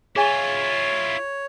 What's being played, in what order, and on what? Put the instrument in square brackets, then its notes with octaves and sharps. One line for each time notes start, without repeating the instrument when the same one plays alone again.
[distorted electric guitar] E4 F4 [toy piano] G#4 G#5 [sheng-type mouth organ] C#5